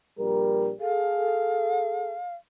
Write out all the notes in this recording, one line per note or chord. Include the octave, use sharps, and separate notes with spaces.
A#1 G3 A#4
G#4 A4 F5